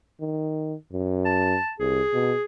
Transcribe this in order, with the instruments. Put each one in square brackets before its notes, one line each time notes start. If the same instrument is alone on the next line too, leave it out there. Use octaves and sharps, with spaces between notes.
[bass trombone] D#3
F#2
[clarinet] A5
[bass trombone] C2 [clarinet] G#4
[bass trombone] B2